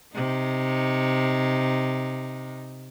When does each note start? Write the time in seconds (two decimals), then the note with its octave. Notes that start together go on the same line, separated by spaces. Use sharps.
0.14 C3 D#4